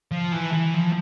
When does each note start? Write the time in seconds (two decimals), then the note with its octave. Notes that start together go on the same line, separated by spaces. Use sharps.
0.11 F3
0.32 E3
0.53 E3
0.74 F3